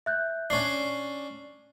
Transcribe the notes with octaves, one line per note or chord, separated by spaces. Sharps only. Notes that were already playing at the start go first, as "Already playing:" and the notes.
E5 F#6 G6
C#4 D4 C7